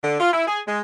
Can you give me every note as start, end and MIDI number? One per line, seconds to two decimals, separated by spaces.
0.03 0.16 50
0.20 0.32 65
0.32 0.47 64
0.47 0.59 68
0.67 0.81 56